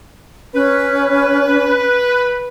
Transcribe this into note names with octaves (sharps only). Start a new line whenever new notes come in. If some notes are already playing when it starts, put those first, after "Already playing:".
C#4 B4